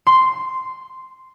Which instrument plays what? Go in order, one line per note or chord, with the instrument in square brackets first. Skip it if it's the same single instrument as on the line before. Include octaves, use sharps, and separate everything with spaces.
[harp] C6